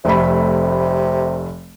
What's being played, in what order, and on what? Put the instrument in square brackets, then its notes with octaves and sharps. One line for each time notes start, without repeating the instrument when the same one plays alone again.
[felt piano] F1 A3 B5 [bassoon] C3